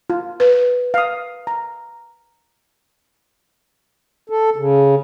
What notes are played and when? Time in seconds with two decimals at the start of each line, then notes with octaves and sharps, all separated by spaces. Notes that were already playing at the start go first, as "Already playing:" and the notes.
0.10 F4
0.40 B4
0.94 F5 D#6
1.47 A#5
4.30 A4
4.56 C#3